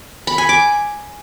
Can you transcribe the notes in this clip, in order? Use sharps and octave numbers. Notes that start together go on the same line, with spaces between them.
B5
G#5
D6